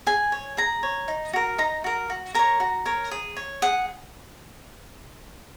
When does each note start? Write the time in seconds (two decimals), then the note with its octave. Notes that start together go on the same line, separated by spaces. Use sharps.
0.07 G#4 G#5
0.32 C#5
0.57 G#4 A#5
0.83 C#5
1.08 D#4
1.33 F#4 A#4
1.58 D#4 A#5
1.84 F#4 A#4
2.10 F#4
2.34 A#4 C#5 A#5
2.60 F#4
2.85 A#4 C#5
3.11 G#4
3.36 C#5
3.62 G#4 F#5